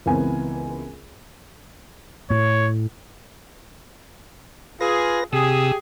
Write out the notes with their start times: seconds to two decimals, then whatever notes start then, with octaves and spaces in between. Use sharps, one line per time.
0.06 C#2 E3 B3 C4 A#4 G#5
2.30 A2 C#5
4.81 F4 G#4 B4 A#6
5.33 C3 G4 G#4 D#6 E6